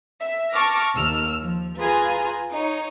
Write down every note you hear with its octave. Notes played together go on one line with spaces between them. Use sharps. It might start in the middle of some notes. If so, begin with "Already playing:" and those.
E5
A5 C#6 D6 F6 A#6
D#2 E6 F6
F3
F4 G#4 B4 G#5 A#5
D#4 C#5